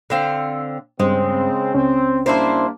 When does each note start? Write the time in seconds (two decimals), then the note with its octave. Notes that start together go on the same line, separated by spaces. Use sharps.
0.10 D3 C4 F5
1.00 G2 C#3 G#3 C4 C5
1.74 C#2 C4 C#4
2.26 G3 A#3 C4 D4 E4 C5